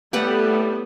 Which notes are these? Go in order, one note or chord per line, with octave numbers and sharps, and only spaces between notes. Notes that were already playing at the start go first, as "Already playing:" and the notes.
A2 G3 A3 B3 G4 B4 F#5